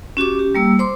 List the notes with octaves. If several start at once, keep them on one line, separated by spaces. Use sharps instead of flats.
C#4 F#4 G4 D6
G4
G3 A#3 E6
C5 C6 D6